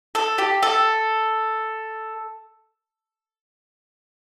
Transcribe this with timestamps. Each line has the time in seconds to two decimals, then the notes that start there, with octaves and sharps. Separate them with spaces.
0.15 A4
0.38 G4
0.63 A4